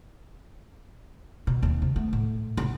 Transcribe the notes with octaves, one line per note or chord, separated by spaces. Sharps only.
B2
D#2 C4
C3
A3 B3
A2
E1 B1